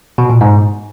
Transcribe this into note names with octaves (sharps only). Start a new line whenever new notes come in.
B2
A#2
G#2